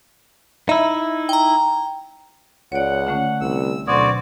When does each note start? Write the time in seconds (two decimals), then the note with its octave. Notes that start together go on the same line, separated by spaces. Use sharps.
0.69 D#4 E4 E5
1.29 G5 A#5
2.72 C#2 C#5 D5 F#5
3.07 D3 A3 C#4
3.41 C2 E6
3.88 D2 B2 F#3 C4 F#4 D5 C6 G#6